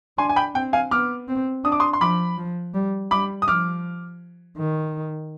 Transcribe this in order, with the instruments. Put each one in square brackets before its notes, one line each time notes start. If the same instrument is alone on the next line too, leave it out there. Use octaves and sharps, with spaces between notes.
[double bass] D4 [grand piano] G#5 C6
[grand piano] G#5
G5 B5
[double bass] C4 [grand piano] G5
[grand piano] F5 G#5
[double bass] B3 [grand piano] D6 F6
[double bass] C4
[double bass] D4 [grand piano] D#6
[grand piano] D6
C6 D#6
C6
[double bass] F3 [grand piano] B5 D6
[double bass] F3
G3
[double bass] G3 [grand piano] B5 D6
[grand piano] D#6
[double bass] F3 [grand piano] D6 F6
[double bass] D#3